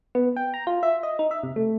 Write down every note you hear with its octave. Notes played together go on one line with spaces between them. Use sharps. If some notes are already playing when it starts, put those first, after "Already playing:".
B3
G5
A#5
F4
E5
D#5
D#4
E5
C3
A3